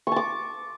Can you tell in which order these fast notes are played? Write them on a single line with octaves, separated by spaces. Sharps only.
C#6 A5 D6